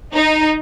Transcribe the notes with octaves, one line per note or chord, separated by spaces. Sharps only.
D#4